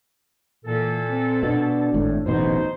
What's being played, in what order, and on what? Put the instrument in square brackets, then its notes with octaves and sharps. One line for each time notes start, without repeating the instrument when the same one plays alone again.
[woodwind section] A#2 A4 [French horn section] E3 A#3
[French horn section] C4
[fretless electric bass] B2 [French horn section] D4
[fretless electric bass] G#1 A2
[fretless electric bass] D1 A1 B2 [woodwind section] D#4 C5